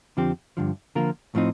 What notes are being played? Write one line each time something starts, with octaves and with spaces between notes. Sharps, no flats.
F2 D3 F3 C4 G4
G2 D3 F3
D3 F3 A#3 F4 A#4
A2 F3 C4 D#4